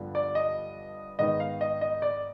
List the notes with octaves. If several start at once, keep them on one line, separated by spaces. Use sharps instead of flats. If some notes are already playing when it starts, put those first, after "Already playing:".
Already playing: G2 D3 F3 B3
D5
D#5
G#2 D#3 B3 D#4 D#5
F5
D#5
D#5
D5